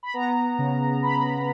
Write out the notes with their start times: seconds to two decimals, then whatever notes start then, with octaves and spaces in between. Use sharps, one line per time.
0.03 B5
0.14 B3 A#5
0.59 C#3
1.02 C#3 B5